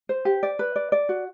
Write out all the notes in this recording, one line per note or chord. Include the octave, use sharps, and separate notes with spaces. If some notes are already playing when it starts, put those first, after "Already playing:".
C5
G4
D5
B4
D5
D5
F#4